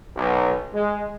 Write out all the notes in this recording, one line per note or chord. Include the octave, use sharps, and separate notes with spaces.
B1
G#3